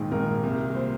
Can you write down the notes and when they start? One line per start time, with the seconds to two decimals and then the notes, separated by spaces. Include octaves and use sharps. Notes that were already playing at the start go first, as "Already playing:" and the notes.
Already playing: A#1 G#2 D#3
0.11 A#1 G#2 D#3 A#4
0.43 C2 A#2
0.75 A#2 C5